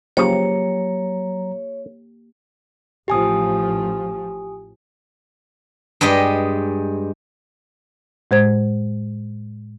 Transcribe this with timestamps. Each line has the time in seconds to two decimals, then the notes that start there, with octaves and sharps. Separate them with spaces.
0.17 C#3 F3 F#3 A#3 G4 C#5 A#5
3.08 A1 F3 G4 G#5 D#6
6.01 G2 G#3 G4 D#5
8.31 A2 G#3 C5 G#6